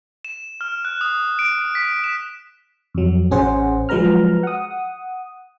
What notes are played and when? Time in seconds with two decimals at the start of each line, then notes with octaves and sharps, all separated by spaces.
0.25 E7
0.61 F6
0.85 F#6
1.01 D#6
1.39 D7
1.75 B6
2.04 E7
2.94 F2 F#3
3.31 A1 C#4 G#4 C5 F#5
3.89 F3 F#3 G#3 B4 A#5 F6
4.43 F#5 D#6